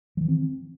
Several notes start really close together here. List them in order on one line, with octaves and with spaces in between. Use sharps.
F#3 E3 D#3 C4